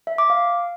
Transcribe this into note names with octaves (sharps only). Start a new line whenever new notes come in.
E5
D6
F5